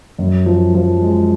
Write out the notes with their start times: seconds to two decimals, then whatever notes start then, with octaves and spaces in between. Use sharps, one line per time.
0.19 F#2
0.46 F3
0.75 F3
1.02 G#3